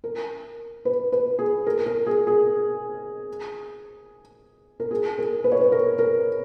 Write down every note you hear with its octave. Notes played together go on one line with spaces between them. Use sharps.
A#4
B4
B4
G#4
A#4
A#4
G#4
G#4
A#4
G#4
A#4
B4
C#5
B4
A#4
A#4